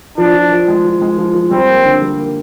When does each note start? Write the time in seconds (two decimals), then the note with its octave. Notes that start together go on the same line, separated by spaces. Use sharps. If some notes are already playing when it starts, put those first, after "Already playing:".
0.18 F3 D4
0.34 F3
0.52 F3
0.68 G#3
0.85 F3
1.02 G#3
1.18 F3
1.35 F3
1.51 G3 C4
1.68 A#3
1.84 D3
2.02 G3
2.18 A#3